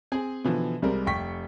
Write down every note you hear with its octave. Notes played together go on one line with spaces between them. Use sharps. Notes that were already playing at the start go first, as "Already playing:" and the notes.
C4 G#4 G#5
B2 D3 E3 F3
C2 G3 G#3 C4 A#4
F1 G5 C#6 B6